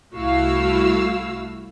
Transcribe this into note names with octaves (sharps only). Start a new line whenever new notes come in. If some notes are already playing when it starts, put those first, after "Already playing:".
C2 A3 E4 F#4 F5 E6